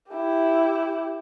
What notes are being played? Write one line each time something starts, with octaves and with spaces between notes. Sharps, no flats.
E4 G4